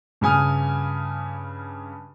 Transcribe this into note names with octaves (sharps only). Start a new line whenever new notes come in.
G2 C#3 G#5 D#6 F6